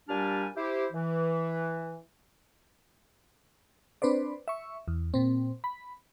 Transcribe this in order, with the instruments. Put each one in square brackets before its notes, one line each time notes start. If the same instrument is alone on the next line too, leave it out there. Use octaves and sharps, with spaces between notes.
[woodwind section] A#2 G3 D4 G4 G#5 F6
E4 G4 C5
E3
[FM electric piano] C4 D4 B4 C5 D5
E5 C#6
E2
A#2 C4
B5